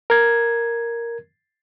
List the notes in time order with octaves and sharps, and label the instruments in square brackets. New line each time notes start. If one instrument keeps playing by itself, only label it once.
[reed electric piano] A#4 G#6